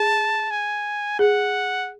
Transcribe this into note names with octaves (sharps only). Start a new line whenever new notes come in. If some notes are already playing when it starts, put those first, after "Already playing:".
Already playing: G#4 A5
G#5
G#4 F#5